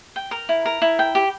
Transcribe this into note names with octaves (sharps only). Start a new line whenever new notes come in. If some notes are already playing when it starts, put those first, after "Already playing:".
G5
A#4
E4
A#4
E4
G5
G4